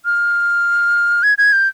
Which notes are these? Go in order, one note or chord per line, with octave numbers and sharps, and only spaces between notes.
F6
G#6
G#6
G6